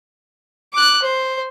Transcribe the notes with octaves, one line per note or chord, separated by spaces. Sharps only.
D6 F#6
C5